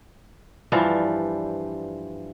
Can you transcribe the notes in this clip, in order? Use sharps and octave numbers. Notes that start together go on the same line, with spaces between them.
G2 E3 F3 G3